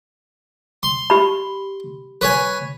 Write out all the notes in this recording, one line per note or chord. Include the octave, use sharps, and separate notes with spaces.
C6
G4 B5
B4 C#5 G#5